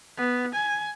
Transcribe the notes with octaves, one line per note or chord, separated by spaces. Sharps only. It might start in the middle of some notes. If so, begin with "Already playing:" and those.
B3
G#5